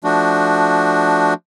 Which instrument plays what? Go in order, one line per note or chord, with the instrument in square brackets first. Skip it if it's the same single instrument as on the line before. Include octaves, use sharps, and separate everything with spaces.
[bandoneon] F3 A3 D4 F#4